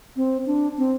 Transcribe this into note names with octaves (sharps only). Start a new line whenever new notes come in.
C4
D4
C4